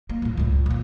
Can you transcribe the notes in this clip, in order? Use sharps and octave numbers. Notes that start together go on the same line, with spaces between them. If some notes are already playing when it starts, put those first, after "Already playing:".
A#3
D#2 A2
C#2 F#2
A#2 D#3